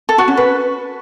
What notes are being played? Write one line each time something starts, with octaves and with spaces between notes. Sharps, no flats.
A4
F#4
C#4
B4